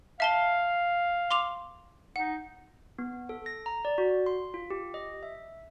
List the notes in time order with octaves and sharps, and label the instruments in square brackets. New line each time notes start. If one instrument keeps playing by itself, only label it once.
[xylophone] E5 A5 G7 [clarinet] F5
[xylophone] C6 D6 F7
[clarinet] D#4 [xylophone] F#5
[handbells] B3
A4
A#6
A#5
D5
F#4
C6
F4
G4
D#5
E5